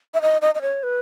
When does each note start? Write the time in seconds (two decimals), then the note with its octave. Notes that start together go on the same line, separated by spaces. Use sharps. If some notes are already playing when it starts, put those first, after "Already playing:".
0.14 E5
0.22 D#5
0.42 D#5
0.55 D#5
0.62 C#5
0.83 B4